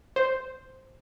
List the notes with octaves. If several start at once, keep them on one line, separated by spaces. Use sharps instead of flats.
C5